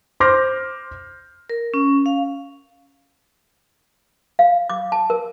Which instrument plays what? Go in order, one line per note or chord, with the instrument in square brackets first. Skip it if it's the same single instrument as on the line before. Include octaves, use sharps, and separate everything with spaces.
[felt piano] C5 C6 D6 F6 G6 A#6
[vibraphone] A#4
C#4
F5
[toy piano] F5
D6
A5
A#4